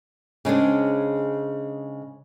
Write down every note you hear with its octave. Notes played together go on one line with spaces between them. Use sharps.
C#3 G#3 C4 D4